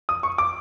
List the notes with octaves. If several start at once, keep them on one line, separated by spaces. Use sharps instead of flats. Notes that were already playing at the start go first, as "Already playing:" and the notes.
D#6
C#6
D6